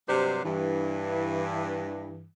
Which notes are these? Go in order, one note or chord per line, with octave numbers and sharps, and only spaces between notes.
G2 C3 F#3 D4 G4 C5
G2 E3